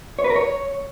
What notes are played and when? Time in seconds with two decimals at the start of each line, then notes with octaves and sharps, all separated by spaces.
0.19 C#5
0.24 B4
0.30 A#4
0.36 C#5